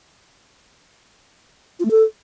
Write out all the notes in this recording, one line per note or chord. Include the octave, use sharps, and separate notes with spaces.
F4
A3
A4